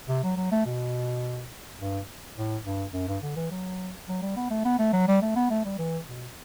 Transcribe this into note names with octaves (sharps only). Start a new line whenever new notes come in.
C3
F#3
F#3
A3
B2
G2
A2
G2
F#2
G2
D3
E3
F#3
F#3
G3
B3
A3
B3
A3
F#3
G3
A3
B3
A3
G3
E3
B2